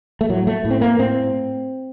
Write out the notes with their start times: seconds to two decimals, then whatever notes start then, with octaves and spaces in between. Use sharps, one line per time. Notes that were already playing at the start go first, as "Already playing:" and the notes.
0.21 A3
0.29 A2 F#3
0.47 A3
0.65 A2
0.71 C4
0.81 A#3
0.98 A2 C4